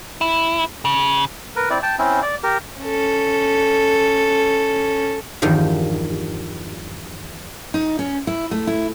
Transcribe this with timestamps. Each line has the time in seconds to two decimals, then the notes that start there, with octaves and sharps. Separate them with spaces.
0.21 E4
0.85 C#3
1.56 A#4 B4
1.70 C4 E4 D5
1.83 G5 A5
1.99 C4 C#4 E4
2.23 D5
2.43 G4 A#4
2.80 C#4 A4
5.42 E2 G2 D#3 F3
7.74 D#4
7.99 C#4
8.27 E4
8.51 A3
8.67 E4